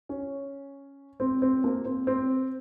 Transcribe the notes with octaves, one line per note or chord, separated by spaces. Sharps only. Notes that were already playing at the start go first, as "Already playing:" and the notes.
C#4
C4
C4
A#3
C4
C4